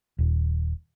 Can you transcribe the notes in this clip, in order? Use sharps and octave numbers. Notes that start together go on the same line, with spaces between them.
D#1